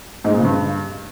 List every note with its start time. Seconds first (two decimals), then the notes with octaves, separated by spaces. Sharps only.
0.24 G#2
0.30 G#3
0.35 A#2
0.40 C#3
0.45 G2